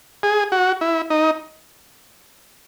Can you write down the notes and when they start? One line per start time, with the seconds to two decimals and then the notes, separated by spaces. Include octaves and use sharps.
0.23 G#4
0.52 F#4
0.81 E4
1.10 D#4